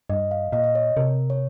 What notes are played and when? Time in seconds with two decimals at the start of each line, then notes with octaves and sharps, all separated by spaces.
0.09 G2 D#5
0.31 F5
0.52 A#2 D#5
0.64 D#5
0.75 C#5
0.97 C3 A#4
1.30 C#5